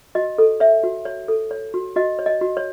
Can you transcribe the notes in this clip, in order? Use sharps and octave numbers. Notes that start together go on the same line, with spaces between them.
F#4 D#5
A4
C#5 E5
F#4
C#5
A4
C#5
F#4
F#4 D#5
C#5
D#5
F#4
C#5